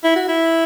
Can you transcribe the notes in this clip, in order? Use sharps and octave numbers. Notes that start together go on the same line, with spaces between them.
E4
F#4
E4